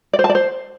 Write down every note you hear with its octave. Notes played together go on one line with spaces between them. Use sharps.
D5
C5
A5
D5
C5